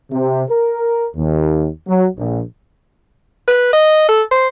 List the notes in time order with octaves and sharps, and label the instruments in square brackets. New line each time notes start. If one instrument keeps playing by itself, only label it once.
[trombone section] C3
A#4
D#2
F#3
A#1
[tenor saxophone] B4
D#5
A4
C5